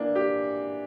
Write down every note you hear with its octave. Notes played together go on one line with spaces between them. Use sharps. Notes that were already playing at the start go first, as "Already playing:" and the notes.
Already playing: E3 A#3 D4
G4